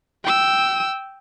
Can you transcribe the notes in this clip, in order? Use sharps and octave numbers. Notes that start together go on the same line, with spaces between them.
G5 E6